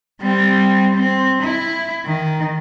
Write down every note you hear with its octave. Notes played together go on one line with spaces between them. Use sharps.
G3 C4
C4
E4
D#3